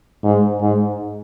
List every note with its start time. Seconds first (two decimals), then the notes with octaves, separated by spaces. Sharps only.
0.23 G#2
0.61 G#2